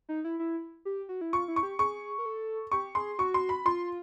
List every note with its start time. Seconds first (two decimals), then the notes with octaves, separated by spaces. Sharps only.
0.09 D#4
0.25 E4
0.39 E4
0.85 G4
1.09 F#4
1.21 E4
1.33 F4 C#6
1.48 E4
1.56 C#6
1.63 G4
1.79 G#4 C#6
2.18 A#4
2.26 A4
2.72 G4 C#6
2.95 G#4 C6
3.19 F#4 C#6
3.34 C6
3.49 B5
3.65 F4 C6